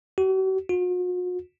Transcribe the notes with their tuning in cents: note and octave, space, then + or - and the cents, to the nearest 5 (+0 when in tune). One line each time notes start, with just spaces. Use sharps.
F#4 +45
F#4 -45